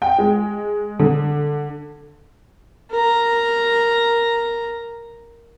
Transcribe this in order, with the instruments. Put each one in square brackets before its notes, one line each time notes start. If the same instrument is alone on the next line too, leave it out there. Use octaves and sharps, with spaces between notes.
[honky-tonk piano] G5
G#3
D3
[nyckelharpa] A#4 A#5